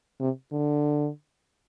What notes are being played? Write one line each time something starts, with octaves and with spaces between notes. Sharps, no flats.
C3
D3